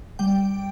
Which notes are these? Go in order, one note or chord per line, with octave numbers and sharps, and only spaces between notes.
G3 G5